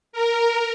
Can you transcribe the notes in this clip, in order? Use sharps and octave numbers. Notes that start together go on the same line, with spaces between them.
A#4